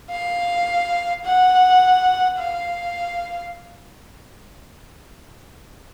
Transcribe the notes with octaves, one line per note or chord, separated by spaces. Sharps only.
F5
F#5
F5